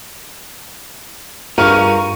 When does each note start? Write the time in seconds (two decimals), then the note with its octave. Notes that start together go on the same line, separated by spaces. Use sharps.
1.58 G2 F4 G#4 A#4 F5 C#6 D#7